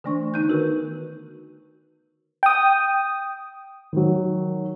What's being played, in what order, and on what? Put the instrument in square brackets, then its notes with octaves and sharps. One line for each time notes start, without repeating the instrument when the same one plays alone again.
[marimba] D3 E3 A3 D4 C#6
B3 D#4 F#6 G6
D#3 F#4 A#4 B4
[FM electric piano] G5 D#6
[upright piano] D#3 F#3